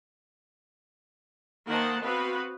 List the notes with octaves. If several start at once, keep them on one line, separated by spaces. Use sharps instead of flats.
D#3 A#3 C5 D#5 F#5 A5
B3 C4 F#4 B4 F5